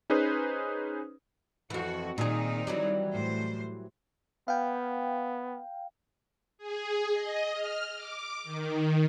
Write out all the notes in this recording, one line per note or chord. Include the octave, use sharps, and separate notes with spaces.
C#4 D#4 G#4 B4 C5 D#6
F2 E3 F#4
A#2 D#3 C4 D#4 G#4
E3 F#3 G3
A2 C5
B3 F5 G5
G#4
D#5
F6
D6
D#3